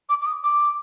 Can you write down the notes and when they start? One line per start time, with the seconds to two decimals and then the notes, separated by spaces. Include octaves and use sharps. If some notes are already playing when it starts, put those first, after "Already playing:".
0.09 D6
0.21 D6
0.26 D#6
0.43 D6